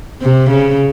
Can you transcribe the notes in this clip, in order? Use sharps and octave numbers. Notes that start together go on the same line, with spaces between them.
C3
C#3